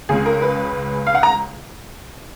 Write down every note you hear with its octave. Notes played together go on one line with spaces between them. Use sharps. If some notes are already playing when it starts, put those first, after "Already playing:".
C#2 C#3 G#3 G#4
A#4
B4
F5
F#5
A#5